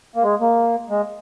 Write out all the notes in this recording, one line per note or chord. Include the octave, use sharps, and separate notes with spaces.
A#3
G#3
A#3
G#3